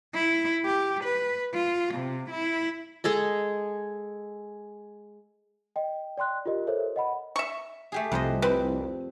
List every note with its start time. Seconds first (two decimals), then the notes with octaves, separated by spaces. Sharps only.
0.14 E4
0.65 G4
1.04 B4
1.54 F4
1.95 C3
2.30 E4
3.04 G#3 G#4 A4 D#5
5.76 D#5 G5
6.17 D5 G5 C6 F#6
6.46 F4 G4 A#4 D#5
6.67 A4 A#4 C5 C#5 E5
6.96 D#5 F#5 B5
7.36 E5 C#6
7.92 A3 G4 G#4
8.12 C2 F2 C5 D#5
8.42 C4 B4